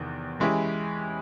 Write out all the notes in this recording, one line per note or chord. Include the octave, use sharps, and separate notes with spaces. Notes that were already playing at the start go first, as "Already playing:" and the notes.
Already playing: E2 C3 D#3
E3 G#3 C#4 E4 G4